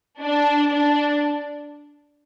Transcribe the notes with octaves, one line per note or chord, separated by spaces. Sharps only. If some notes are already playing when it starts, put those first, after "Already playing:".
D4
D4